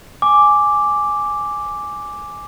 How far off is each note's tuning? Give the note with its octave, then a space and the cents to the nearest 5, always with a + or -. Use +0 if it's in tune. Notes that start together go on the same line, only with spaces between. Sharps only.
G#5 +0 D6 +0